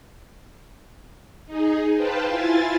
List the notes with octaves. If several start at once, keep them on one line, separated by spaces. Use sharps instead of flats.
D#4 G#4
B4 C5 F5 G5 A5
E4 F4 G#5 A6